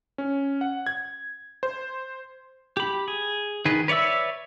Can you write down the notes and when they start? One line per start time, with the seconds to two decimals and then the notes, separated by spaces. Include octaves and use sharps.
0.18 C#4
0.61 F#5
0.86 G#6
1.63 C5
2.77 G4 B5
3.08 G#4
3.65 D#3 G#4 B4
3.88 B4 C#5 D5 E5 E6